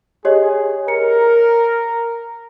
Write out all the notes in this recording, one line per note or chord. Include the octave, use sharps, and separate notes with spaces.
G4 G#4 C#5 D#5
A#4 C#7